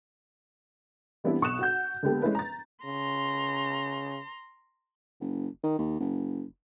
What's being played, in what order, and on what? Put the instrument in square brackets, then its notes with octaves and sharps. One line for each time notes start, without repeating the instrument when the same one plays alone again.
[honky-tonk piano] E3 G3 B3 C4 D4 E4
B1 C#6 D#6 F#6 E7
F#4 F#5 G6
D3 G#3 A#3 B3 G4 A4
G#3 C#4 E4 B4
A#5 A6
[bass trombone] C#3 [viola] A#5 C6
[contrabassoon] F#1
D#3
D#2
F#1